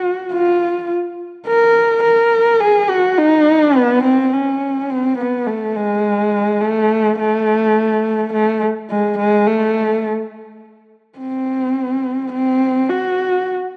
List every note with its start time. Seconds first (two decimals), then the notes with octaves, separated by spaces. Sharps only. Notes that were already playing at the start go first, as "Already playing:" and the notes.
Already playing: F#4
0.32 F4
1.47 A#4
2.03 A#4
2.60 G#4
2.89 F#4
3.18 D#4
3.76 B3
4.04 C4
4.33 C#4
4.90 C4
5.18 B3
5.47 A3
5.76 G#3
6.61 A3
7.19 A3
8.33 A3
8.89 G#3
9.18 G#3
9.47 A3
11.18 C4
12.32 C4
12.89 F#4